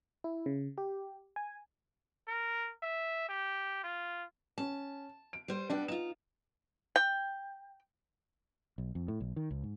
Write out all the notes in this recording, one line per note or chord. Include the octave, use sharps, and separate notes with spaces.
E4
C#3
G4
G#5
A#4
E5
G4
F4
C#4 A5
D7
G3 C5
G3 B3 D4 G5
D#4 F4 E7
G5
B1
F2
A2
B1
D#3
C#2
G#2